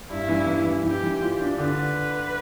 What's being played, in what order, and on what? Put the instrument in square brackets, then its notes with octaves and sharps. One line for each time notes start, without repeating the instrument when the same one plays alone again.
[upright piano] G2 [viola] E4
[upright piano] E3
E3
E3
[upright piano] E3 [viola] G4
[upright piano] E3
F4
D4
[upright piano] D3 [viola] B4